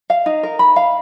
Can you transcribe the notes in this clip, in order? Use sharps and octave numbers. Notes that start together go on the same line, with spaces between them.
F5
D#4
A#4
B5
F5